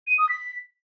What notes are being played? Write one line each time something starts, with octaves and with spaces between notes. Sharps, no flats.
D#7
D#6
B6